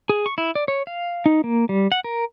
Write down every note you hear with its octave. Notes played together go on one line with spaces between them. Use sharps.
G#4
C#6
E4
D5
C#5
F5
D#4
A#3
G3
F#5
A#4